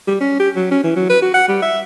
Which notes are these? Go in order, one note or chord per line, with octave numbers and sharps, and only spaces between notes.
G3
C#4
G4
F#3
C#4
E3
F#3
B4
F#4
F#5
G3
E5